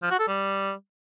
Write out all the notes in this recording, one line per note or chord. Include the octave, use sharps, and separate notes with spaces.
F3
F#4
A4
G3